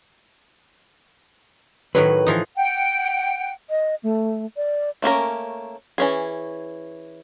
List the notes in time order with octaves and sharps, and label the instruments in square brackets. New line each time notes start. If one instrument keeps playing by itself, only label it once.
[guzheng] A2 D#3 F#3 [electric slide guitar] B4
[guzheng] E3 F3 D#4
[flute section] F#5 G5
[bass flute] D#5
A3
D5
[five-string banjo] A3 A#3 C#4 A#4
E3 C#4 G#4